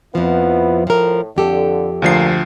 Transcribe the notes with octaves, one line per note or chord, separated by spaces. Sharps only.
F2 F3 B3 E4
A2 F3 A#4
F2 D3 G4 A4
D2 A#2 F3 C7